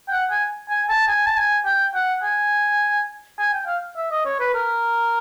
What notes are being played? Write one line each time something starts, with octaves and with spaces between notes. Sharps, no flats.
G5
F#5
G#5
G#5
A5
G#5
A5
G#5
G5
F#5
G#5
G#5
G5
F5
E5
D#5
C#5
B4
A#4